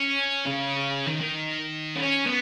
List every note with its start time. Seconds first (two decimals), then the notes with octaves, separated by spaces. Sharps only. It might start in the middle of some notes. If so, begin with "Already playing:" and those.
Already playing: C#4
0.46 C#3
1.06 D#3
1.21 D#3
1.95 C#4
2.26 B3